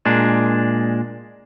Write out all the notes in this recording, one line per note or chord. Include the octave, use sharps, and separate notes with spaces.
A#2 G#3 D4